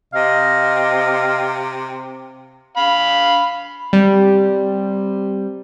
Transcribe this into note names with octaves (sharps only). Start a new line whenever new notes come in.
C3 D#5 F5
F5 B5
C3 G3